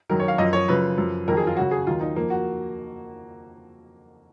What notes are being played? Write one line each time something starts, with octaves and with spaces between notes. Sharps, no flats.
F#2 D#3 F#3 A#4
C#5
F5
F#2 F3 D#5
C#5
F#2 C#3 F3 B4
F#2 F3
F2 D#3 F#3 A#4
G#4
F4
F#2 C#3 F#3 F#4
G#4
D#2 D#3 F#3 F4
D#4
F2 F3 A#3
F#4